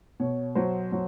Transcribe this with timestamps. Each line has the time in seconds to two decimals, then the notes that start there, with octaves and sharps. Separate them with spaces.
0.20 B2 C#5
0.55 F#3 C5
0.92 F#3